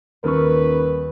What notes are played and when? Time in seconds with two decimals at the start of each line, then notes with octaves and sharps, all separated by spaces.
0.24 D#1 D#2 A#4 B4 C#6 E6 F6